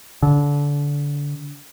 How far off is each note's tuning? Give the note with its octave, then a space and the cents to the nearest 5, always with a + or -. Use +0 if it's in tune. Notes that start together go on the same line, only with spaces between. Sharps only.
D3 -25